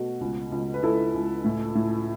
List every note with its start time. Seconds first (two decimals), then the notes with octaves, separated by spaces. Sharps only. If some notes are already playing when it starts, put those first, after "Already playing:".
Already playing: B2 A3 F#4
0.21 C#2
0.52 C#2
0.74 B4
0.83 C#2 E4 A4
1.14 C#2
1.44 A2
1.75 A2